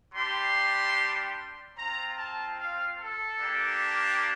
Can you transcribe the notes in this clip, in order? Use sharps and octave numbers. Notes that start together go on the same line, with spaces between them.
G3 D4 G4 C6
C4 F4 A#5
A5
F5
A4
A#3 D4 G4